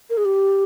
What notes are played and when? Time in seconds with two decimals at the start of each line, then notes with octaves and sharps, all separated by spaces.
0.10 A#4
0.17 G#4
0.25 G4